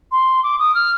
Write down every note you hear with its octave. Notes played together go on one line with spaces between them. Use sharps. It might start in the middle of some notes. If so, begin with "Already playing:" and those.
C6
D6
D#6
F6